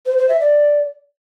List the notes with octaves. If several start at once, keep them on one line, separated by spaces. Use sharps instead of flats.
C5
C5
E5
D5